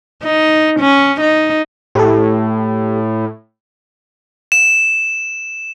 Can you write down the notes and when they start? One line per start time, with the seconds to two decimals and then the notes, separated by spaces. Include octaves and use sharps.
0.23 D#4
0.80 C#4
1.21 D#4
1.95 A2 G4 A4
4.52 E7